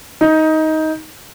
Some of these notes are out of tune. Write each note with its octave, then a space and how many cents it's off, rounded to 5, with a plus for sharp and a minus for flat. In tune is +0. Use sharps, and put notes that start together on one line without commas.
D#4 +15